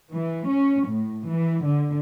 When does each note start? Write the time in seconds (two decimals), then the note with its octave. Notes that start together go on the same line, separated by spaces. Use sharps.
0.12 E3
0.48 C#4
0.89 A2
1.29 E3
1.67 D3